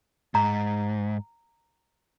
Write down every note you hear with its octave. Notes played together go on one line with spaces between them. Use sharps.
G#2 A#5